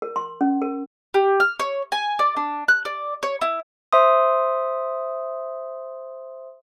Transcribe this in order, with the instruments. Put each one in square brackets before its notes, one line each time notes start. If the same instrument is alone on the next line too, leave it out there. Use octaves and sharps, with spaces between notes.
[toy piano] A#4
C6
C#4
A#4
[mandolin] G4
F6
C#5
G#5
D5
D4
F#6
D5
C#5
E4
[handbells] C5 E5 C6 D#6